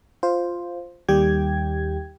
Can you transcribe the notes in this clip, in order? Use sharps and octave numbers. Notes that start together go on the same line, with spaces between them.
F4 C5
D#2 D#3 G3 G4 G5 G#6